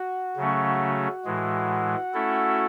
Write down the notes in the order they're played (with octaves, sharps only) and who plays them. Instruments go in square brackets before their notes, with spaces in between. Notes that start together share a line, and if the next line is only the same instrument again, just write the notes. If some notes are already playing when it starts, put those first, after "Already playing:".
Already playing: [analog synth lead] F#4
[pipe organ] C#3 F#3 A3 C#4
A2 E3 G#3
A3 C#4 E4 A4